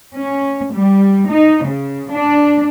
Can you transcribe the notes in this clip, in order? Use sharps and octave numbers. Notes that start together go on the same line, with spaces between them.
C#4
G3
D#4
C#3
D4